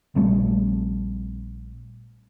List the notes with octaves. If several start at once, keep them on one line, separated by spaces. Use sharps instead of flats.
A#1 G3 A3 C4